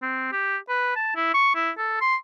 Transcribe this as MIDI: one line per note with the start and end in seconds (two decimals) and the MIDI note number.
0.02 0.32 60
0.32 0.57 67
0.69 0.95 71
0.96 1.16 81
1.16 1.32 64
1.34 1.55 85
1.55 1.70 64
1.77 1.99 69
2.01 2.16 84